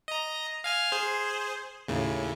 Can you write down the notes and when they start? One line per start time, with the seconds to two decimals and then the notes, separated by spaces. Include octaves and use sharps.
0.08 D#5 A#5
0.64 F5 G#5 F6
0.92 G#4 C5
1.88 D#2 A2 C#3